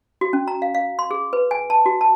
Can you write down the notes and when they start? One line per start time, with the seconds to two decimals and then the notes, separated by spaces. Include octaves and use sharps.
0.21 F#4
0.33 C#4
0.47 A#5
0.62 F5
0.74 F5
0.99 C6
1.11 G#4
1.33 B4
1.51 G#5
1.70 A5
1.86 F#4
2.01 A5